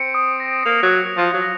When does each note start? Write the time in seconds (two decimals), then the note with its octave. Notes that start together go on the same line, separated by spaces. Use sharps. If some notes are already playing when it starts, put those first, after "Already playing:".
Already playing: C4 C#7
0.14 D#6
0.40 A#6
0.65 A#3 F7
0.82 F#3
0.92 C#7
1.17 F3 F#6
1.33 F#3
1.42 A#6